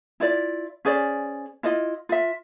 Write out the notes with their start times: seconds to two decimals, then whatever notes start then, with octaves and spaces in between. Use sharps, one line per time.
0.20 E4 F4 D5
0.85 C#4 G#4 C5 D5
1.63 E4 F4 D#5
2.09 F4 E5